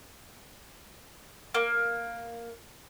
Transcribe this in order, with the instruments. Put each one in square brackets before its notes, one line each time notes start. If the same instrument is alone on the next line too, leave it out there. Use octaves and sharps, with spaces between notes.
[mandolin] A#3